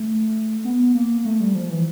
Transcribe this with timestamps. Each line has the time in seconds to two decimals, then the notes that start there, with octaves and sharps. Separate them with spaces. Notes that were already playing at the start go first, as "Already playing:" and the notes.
Already playing: A3
0.65 B3
0.95 A#3
1.25 A3
1.40 G3
1.55 F3
1.70 E3